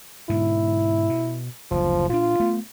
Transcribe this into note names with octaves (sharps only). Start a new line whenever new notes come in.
G#2 B2 D3 E4
B2
F#1 D2 F3
A#2 D4 F4
A3 B3